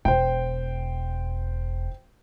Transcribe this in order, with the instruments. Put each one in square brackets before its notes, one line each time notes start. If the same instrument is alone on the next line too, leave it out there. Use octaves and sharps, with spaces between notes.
[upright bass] E1 [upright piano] C5 G5